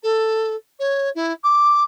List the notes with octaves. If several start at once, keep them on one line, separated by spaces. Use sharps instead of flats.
A4
C#5
E4
D6